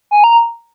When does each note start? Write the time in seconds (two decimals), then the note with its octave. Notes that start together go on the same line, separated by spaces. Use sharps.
0.11 G#5
0.24 A#5